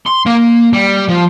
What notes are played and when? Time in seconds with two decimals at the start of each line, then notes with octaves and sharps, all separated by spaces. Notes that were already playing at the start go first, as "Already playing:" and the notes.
0.06 C6
0.26 A#3
0.73 G3
1.09 F3